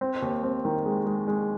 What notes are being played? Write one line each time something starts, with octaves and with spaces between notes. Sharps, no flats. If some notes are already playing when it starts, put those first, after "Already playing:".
C4
D#2
C4
D#3
G#3
G#3
G#3